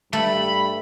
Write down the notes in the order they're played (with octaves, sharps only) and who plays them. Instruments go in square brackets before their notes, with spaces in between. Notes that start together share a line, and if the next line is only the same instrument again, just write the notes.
[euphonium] G2 [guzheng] A3 [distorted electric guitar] B5